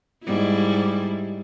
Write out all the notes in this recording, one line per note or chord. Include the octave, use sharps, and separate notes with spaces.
G#2 G3 E4